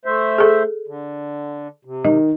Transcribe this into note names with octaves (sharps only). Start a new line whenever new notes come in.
A3 C5 E5
G#4 A4
D3
C3
D#3 D#5